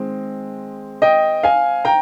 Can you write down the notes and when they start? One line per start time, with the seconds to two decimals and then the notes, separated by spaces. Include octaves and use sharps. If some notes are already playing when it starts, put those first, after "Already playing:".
Already playing: D#3 G#3 C4
1.02 D#5 G5
1.43 F5 G#5
1.85 G5 A#5